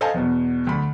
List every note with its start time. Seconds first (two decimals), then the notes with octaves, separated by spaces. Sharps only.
0.01 A4 C5 D#5 F5 G#5 A5
0.14 E2 B2
0.67 D2 B5